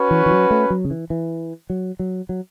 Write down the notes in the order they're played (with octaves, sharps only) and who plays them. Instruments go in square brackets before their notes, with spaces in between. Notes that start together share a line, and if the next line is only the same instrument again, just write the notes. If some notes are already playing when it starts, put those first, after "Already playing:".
Already playing: [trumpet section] C#4 F#4 B4
[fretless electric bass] E3
E3
F#3
A3
F#3
C#3
E3
E3
F#3
F#3
F#3